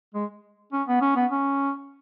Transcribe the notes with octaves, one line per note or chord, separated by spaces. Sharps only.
G#3
C#4
B3
C#4
B3
C#4